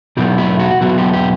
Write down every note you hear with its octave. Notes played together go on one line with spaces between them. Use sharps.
E2 B2 F#3 B3 E4 G4
E4
F#4
E2 B2 F#3 B3 E4 F#4
G4
G4